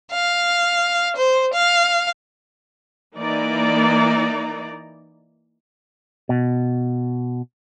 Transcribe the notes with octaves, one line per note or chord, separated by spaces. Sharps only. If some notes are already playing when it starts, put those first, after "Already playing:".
F5
C5
F5
E3 A#3 D#4 D5 A#5
B2